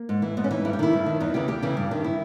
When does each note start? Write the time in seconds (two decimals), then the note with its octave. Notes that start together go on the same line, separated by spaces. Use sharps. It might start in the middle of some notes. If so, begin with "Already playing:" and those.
Already playing: A#3
0.09 G#2
0.22 E3
0.37 G#2 B3
0.44 C#4
0.51 E3 D#4
0.65 G2 E4
0.73 G4
0.79 D#3 E4
0.93 G2
1.06 D#3
1.20 E2 D#4
1.34 C#3 E3 G4
1.48 E2 G4
1.62 C#3 E3
1.77 G2
1.91 D#3
2.04 E4